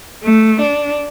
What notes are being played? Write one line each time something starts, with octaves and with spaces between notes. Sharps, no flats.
A3
D4